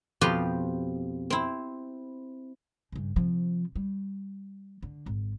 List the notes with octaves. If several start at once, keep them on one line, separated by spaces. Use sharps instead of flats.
F2 B2 F3 G4 B4 C6
C4 E4
G2 C#3
C3 F3
G3
D3
G#1